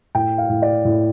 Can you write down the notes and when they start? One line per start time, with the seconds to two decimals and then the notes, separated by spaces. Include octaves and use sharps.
0.15 A2 G5
0.38 F5
0.49 A2
0.62 D5
0.85 A2